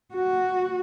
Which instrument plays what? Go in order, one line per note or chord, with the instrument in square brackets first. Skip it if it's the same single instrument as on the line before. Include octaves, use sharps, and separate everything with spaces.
[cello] F#4